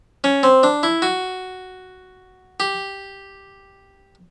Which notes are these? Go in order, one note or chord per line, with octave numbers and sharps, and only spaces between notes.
C#4
C4
D4
E4
F#4
G4